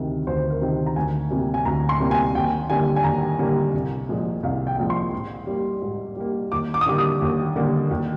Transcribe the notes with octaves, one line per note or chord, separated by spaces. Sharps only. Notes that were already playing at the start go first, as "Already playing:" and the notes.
Already playing: D2 C3 D#3
D2 C5
A#4
C3 D#3
A#5
D2 G#5
C3 G3 A#3
G#5
D2 A#5
C6
C3 G3 A#3
G#5
D#2 G5
D3 G3 A#3 G#5
G#5
D#2 A#5
D3 G3 A#3
C2
A#2 F3 G#3
C2 F5
G5
A#2 F3 G#3
C6
G#2
G3 A#3
G#2
G3 A#3
D#2 D6
D6
D#6
D3 G3 A#3 D6
D#6
D#2
D3 G3 A#3
D#2